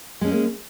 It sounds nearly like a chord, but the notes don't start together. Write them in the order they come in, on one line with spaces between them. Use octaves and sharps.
G#3 C#4 G3 A#3